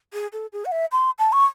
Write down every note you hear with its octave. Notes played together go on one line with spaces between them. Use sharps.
G#4
A4
G#4
F#5
E5
C6
A5
C#6